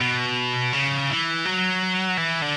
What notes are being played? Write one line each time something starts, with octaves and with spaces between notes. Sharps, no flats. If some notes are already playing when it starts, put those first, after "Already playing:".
B2
C#3
E3
F#3
E3
D3